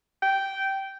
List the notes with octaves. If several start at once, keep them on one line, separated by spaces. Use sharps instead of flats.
G5